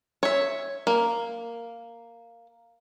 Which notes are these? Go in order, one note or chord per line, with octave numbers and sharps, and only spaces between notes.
C#5 E5
A#3